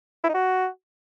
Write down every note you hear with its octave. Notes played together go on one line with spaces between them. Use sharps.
E4
D#4
F#4